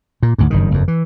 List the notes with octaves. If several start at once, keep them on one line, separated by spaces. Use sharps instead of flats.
A#2
D2 G#2
F#1 G2 D#3
F#1 F2
E3